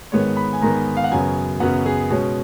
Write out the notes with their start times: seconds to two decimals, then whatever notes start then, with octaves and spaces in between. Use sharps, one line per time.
0.12 G#2 D#3 G#3 B3 C#5
0.37 B5
0.53 G#5
0.61 G#2 D#3 G#3 B3 A#5
0.97 F5
1.04 F#5
1.12 F#2 C#3 F#3 B3 G#5
1.60 F#2 C#3 F#3 B3 F#5
1.86 G#4
2.11 B2 G#3 C#4